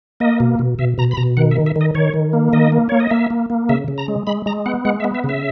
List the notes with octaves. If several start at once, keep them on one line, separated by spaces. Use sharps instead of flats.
A#3 D#5
B2
B2
B2 E5
B2 A#5
B5
B2 A#5
D#3 F#5
E5
D#3
E5
D#3
D#5
D#3 C#5
D#3
A#3
D#3 D#5
A#3
A#3 C#5
D#5
A#3 E5
A#3
A#3
C#3 E5
C#3
A#5
G#3
G#3 B5
G#3 A#5
B3 F#5
G#3 F#5
E5
B3
E5
C#3
E5